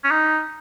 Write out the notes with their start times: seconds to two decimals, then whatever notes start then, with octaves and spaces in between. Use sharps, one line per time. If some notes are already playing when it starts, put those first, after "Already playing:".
0.04 C#4
0.11 D#4